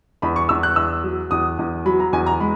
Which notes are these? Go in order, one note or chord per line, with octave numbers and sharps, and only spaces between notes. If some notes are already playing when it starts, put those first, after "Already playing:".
E2 B5
C#6
E2 E6
F#6
E2 E6
F#3
E2 D#6
E2
F#3 B5
A#5
E2 G#5
A#5
G#3 B5